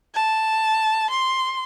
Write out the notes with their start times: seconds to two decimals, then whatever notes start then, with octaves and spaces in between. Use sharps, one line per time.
0.14 A5
1.10 C6